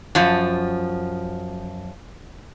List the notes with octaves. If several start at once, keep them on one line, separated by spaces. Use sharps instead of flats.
F#2 F3